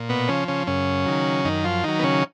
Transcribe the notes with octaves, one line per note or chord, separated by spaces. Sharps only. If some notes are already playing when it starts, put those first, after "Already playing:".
Already playing: A#2
B2 B3
C#3 F3 C#4
C#3 C#4
F#2 C#3 C#4
D#3 F#3
F#2 D#3 D#4
F3 F4
D#3 F#3 D#4
B3
C#3 C#4